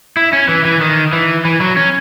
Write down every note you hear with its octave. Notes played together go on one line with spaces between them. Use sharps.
E4
C#4
E3
E3
D#3
E3
E3
F#3
C#4